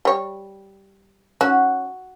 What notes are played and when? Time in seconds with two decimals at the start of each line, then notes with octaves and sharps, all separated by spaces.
0.05 G3 C#5
1.41 C#4 F#4